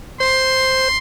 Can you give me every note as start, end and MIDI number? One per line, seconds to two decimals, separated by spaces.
0.20 0.88 72
0.20 0.98 84